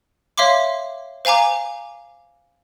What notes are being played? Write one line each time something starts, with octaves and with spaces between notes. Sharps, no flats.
C#5 E5 F5 C6 D6
C5 F5 G#5 A#5 D6